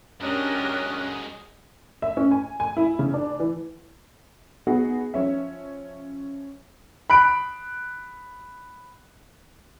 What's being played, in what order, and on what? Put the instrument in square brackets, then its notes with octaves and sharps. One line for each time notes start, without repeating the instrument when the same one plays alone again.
[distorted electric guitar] F#2 G#3 [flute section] C#4 F#6 [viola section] D4 G4 A#4 [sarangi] D#5
[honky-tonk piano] E5
C#4
G#5
G#5
E4
C#3
D4
E3
B3 D#4 F#4 G#4
F3 C#4 E5
[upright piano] B5 F#6 D7